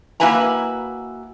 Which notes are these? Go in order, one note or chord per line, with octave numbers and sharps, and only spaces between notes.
A#3 E4 F#4 B4 G#5 A#5